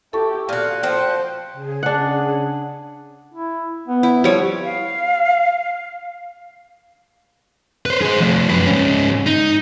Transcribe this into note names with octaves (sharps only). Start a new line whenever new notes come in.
E4 G4 A4 A5 C#6
A#2 F#4 F5
F3 F#4 C5 G5
C#3 G#4
D4 F#5
E4
B3
E4
F3 G3 C#5
F5
B4 C5
G#4 C5
F3 A3
F#2 B4
G#2 C#4
D#4